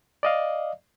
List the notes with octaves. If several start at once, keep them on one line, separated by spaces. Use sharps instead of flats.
D5 D#5 F5